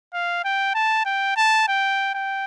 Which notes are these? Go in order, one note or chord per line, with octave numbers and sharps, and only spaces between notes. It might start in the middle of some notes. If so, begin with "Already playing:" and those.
F5
G5
A5
G5
A5
G5
G5